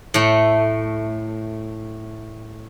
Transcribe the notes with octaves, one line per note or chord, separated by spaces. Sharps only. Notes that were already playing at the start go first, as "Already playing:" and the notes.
A2 A3